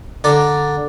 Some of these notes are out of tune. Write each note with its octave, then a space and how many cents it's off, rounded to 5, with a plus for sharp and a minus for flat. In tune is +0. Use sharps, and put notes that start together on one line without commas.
D3 +0 D5 +0 A#5 +0